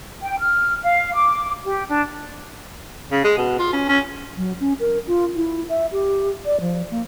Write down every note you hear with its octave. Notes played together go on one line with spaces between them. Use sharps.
G5
F6
F5
D6
G4
D4
C#3
G#3
B2
F4
C#4
C#4
F#3
C#4
A#4
F4
E4
E5
G4
D5
F3
A#3